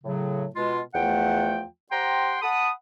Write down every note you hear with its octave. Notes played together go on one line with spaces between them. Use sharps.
A2 C#3 F#3
B2 G#3 F4
E2 F3 A3 F#5 G5
G4 C5 F#5 G5 A#5 C6
F#5 A5 B5 D#6